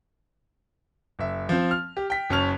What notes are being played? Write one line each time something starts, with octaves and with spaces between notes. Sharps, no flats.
F#1 E5
F3 C4
F6
G4
G5 B6
F#1 F#2 C#4 A5 F6 F7